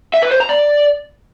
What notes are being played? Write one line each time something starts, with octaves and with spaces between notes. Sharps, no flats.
E5
B4
C5
A#5
D5